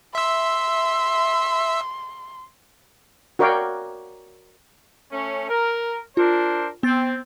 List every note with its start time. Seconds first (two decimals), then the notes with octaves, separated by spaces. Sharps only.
0.15 E5 C6 E6
3.39 F#4 A#4 C#5 D5 F5 G5
5.11 A3 C#4
5.49 A#4
6.17 D4 F4 A#4 C5
6.83 B3 C4 A6